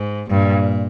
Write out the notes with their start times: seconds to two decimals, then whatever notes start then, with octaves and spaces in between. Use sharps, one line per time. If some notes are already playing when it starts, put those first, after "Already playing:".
Already playing: G#2
0.29 G2 A#2